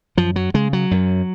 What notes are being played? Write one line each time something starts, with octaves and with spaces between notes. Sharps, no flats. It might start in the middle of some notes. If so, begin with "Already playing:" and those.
F#2 F3
F#3
C#3 G#3
F#3
F#2